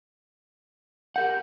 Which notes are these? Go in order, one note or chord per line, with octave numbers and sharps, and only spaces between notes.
G4 A#4 F#5 G6